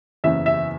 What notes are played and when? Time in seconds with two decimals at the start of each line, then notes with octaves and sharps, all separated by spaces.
0.24 F#1 E2 C#3 E5
0.46 E5